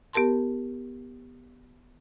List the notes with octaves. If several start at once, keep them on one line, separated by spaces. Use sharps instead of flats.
B3 G4 A#4 A5 C6